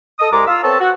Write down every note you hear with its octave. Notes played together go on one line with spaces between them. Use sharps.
A4 D#5 D#6
C2 G#3 A#5 D6
F4 E6
B3 C4 A4 C#5 E5 A5
F#4